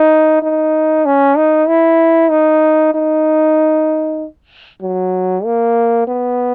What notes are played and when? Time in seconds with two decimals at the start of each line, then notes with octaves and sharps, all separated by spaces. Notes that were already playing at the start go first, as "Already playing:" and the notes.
Already playing: D#4
0.42 D#4
1.05 C#4
1.37 D#4
1.68 E4
2.30 D#4
2.94 D#4
4.82 F#3
5.45 A#3
6.07 B3